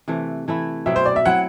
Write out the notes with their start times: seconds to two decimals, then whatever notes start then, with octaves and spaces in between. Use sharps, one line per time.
0.08 C3 E3 A3
0.48 E3 A3 E4
0.86 B2 F#3 C4 E5
0.96 C5
1.06 D5
1.16 E5
1.25 F#3 C4 E4 F#5